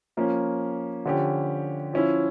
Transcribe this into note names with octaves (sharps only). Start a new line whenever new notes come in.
F3 A#3 C#4
D3 F3 C#4 G4
F3 C#4 E4